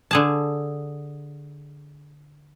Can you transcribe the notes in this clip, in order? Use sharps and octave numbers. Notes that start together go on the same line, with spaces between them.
D3 G#4 A5